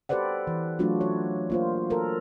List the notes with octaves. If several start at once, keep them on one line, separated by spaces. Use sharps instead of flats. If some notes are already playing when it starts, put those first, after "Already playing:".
G4 A4 B4 C5 D5 F#5
E3
F#3 A3 D4 F4 F#4
C#5
A#3 F4 C5
A4 A#4